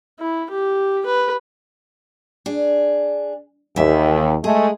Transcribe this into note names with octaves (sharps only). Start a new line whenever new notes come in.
E4
G4
B4
D4 G#4
D#2 E3 E5
G#3 A3 G#4